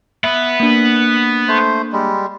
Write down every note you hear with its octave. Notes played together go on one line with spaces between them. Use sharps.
B3 B4 E5
A#3 D4
A3 C5
G3 G#3